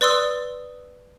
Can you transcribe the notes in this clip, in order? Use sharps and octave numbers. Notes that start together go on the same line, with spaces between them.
B4 D5 C6 D#6 E6